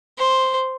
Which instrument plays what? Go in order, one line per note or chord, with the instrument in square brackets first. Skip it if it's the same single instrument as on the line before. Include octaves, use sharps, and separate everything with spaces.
[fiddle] C5